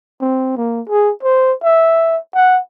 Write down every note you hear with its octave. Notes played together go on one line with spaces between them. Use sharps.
C4
A#3
G#4
C5
E5
F#5